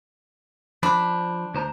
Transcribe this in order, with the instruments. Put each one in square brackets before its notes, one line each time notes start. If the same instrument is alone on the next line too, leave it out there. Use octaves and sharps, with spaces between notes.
[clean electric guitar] F3 C5 B5 [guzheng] D4
[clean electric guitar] D2 C5 A#5